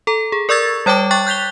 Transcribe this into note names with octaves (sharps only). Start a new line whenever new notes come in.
A4 A#5
G#4
A#4 D5 C#6 E6 G#6 A6
G3 C#5 G5 A5 D6
G5 C#6 F#6 A6
F#6 G6 B6 F7 G7